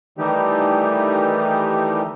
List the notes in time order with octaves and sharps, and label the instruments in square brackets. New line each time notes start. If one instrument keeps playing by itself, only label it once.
[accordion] D#3 E3 G3 A3 D#4 G4